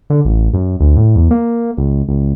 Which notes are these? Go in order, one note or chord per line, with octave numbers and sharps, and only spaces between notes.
D3
A1
F#2
D2
A2
E2
A#3
C#2
C#2